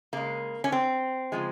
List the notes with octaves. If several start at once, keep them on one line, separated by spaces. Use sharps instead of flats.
C#3 G#3 A#3
C#4
C4
C#3 F3 G#3